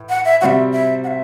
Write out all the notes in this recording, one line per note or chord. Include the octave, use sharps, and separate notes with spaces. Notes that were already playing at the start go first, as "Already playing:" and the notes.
Already playing: A2 E3
F#5
E5
C3 G3 C4 F#4 E5 F#5
E5
F#5
E5